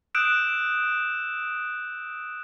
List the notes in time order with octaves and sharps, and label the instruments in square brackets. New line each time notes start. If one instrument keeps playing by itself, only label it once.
[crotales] D#6 E6 F#6 G6 D7 E7